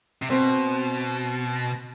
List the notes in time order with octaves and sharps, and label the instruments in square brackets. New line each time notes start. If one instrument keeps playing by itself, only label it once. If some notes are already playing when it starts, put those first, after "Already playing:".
[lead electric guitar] C3
[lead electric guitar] B2 [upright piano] C4